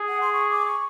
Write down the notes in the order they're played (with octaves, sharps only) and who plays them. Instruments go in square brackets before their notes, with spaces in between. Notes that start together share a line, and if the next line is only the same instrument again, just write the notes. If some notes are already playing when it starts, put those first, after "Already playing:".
Already playing: [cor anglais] G#4
[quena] F#5
C6
C#6
D6
C#6